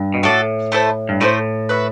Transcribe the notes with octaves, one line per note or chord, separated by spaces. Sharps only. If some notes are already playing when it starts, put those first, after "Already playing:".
Already playing: G2
B2
A2 F#4 A4 D5
A3 E4 A4 C5
G2
A2 A3 E4 A4 C5
F#4 B4 E5